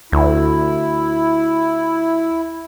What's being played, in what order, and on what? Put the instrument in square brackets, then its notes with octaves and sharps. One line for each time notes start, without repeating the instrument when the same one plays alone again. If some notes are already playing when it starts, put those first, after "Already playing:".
[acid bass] D2 [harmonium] E4